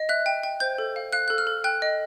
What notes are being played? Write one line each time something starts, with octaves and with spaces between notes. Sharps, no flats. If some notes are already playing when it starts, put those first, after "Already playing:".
Already playing: D#5
E5 F#6
G5
G5
C5 G6
A4
F5
F5 F#6
A4 F#6
F6
A4
G5 F#6
D#5